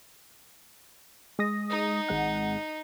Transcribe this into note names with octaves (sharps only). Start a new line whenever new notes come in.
G#3 D#6 A#6
D#4
G#1 G#3 F#5